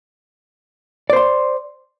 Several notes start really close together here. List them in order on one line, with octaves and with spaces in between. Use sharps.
D5 C5 C6